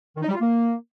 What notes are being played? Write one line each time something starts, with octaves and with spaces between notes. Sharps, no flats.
D#3
D#4
G3
F4
A#3